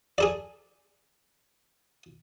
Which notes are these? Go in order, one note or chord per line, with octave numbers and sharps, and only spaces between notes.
G#4 A4 D5